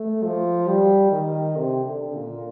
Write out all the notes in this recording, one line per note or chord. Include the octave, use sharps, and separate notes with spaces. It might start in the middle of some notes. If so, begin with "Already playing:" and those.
Already playing: A3
F3
G3
D#3
C3
D3
A#2